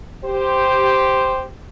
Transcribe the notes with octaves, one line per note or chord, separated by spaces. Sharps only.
G4 C5